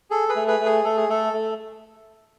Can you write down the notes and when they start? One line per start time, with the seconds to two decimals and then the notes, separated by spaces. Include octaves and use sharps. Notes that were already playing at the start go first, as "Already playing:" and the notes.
0.10 G#4 A4
0.29 G#4 B4
0.36 A3
0.48 G#4 B4
0.60 A3
0.66 G#4
0.84 A3 A4
0.97 G#4
1.09 A3 A4
1.33 A3